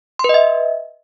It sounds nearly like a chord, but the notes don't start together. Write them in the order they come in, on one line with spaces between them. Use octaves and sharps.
C6 B4 D#5 E5